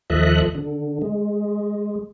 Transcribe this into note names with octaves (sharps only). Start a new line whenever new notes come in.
D#2 F3 A4 D#5 E5 F#6
D3
G#3